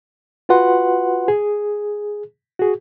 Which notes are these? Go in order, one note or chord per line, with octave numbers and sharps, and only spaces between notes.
F4 F#4 B4 F#5 C6
G#4
F#4 G#4